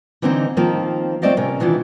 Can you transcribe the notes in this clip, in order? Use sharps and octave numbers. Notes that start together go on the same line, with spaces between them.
D3 E3 A#3 C4 D4 D#4
D#3 F3 A#3 C4
A3 C4 C5 D5 D#5 F5
C3 C#4 A#4
B2 D#3 E3 D4 E4 F4